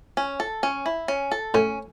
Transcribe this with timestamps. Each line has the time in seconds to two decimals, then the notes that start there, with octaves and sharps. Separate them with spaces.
0.17 C#4
0.40 A4
0.63 C#4
0.86 E4
1.08 C#4
1.32 A4
1.54 A2 C#4